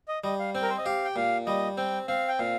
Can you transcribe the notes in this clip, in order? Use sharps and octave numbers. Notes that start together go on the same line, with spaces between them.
D#5
G3 D#5
F5
C4 G5
A#4
C5
D#5
G4 F5
G5
A#2 F5
G3 D#5
C4 G5
C4 F5
G5
A#2 F5